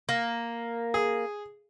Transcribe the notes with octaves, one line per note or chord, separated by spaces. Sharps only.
A#3
G#4